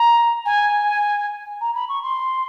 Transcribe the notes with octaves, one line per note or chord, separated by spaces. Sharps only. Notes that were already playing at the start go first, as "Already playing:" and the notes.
Already playing: A#5
G#5
A#5
B5
C#6
C6